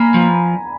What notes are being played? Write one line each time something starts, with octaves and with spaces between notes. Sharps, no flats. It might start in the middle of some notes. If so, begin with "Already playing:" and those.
Already playing: A#3 G#5 A#5 B5
F3